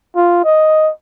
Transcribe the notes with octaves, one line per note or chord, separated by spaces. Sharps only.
F4
D#5